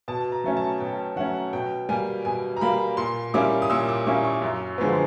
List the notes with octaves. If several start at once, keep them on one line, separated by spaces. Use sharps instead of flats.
B2 A5
A#5
F#3 A3 C#4
A5
B2 G5
F#3 A3 C#4 F#5
B2 G5
G3 A#3 G#5
B2 G#5
A#5
G3 A#3 B5
A#2 C6
G3 A#3 C#4 E4 D6
D#6
A#2 E6
D6
G3 A#3 C#4 E4 C#6
C#6
F#2
D3 F3 G#3 B3